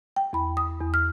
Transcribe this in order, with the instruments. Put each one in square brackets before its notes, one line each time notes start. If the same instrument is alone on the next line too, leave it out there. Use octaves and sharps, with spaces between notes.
[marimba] G5
E2 B5
D#6
E2
F6